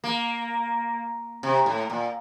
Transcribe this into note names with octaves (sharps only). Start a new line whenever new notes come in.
A#3
C3
A2
A#2